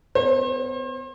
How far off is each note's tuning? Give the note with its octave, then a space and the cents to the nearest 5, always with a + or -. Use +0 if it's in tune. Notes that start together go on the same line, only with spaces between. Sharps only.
B3 +35 C5 +40